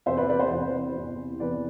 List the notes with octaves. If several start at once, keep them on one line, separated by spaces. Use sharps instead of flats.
E2 C3 E3 C5 E5
B4 D5
B4 D5
C5
E2 C3 E3 C5
E2 C3 E3
E2 C3 E3 B4 D5